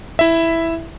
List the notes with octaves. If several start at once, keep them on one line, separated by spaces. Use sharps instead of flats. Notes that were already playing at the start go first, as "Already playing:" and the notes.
E4 E5